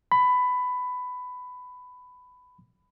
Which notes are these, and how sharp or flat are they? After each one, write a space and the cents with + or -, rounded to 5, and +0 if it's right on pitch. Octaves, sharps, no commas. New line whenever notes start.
B5 +15